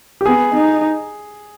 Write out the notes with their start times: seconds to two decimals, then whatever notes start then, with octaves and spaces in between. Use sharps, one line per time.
0.21 G4
0.26 B3 G#4
0.54 D#4